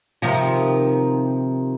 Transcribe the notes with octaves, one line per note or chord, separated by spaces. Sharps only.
C3 D#3 F3